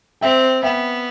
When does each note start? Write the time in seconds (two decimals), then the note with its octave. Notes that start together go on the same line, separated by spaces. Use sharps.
0.21 C4 E5 G5
0.63 B3 E5 G5